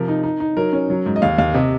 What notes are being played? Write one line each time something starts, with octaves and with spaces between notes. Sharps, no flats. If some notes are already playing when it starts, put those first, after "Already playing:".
Already playing: C3 F3 A#4
D#4
D#4
D#4
F#3 A#4
C#4
F#3
G#2
D#5
D#2 F5
D#2 F5
C3 D#5